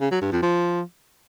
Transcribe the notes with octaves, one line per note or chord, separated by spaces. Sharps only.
C#3
F#3
G2
F2
F3